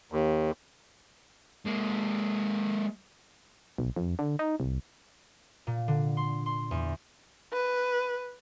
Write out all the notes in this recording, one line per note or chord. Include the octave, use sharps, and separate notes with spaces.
D#2
G#3 A#3
B1
F2
D3
D#4
C2
A#2
D3
C6
C6
E2
B4